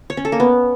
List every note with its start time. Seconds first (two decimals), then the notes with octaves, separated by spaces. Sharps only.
0.10 C#5
0.17 C#4
0.25 A4
0.32 A#3
0.40 B3